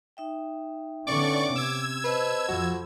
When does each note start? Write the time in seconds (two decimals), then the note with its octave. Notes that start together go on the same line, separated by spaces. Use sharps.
0.17 D#4 E5 G5
1.07 D3 B3 C#4 D5 C#6 D6
1.55 C3 E6 G#6
2.04 B4 C5 D#5 A5
2.48 F2 F3 F#4 B5